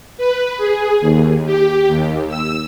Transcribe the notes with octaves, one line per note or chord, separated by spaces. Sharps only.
B4
G#4
D#2
G4
D#2
E6